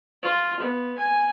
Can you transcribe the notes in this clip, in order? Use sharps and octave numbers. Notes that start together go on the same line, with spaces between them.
F4
B3
G#5